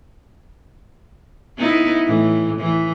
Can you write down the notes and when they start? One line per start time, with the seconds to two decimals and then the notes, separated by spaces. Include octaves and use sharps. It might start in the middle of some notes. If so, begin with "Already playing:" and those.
1.58 B3 D#4 E4
2.06 A2 E3
2.58 E3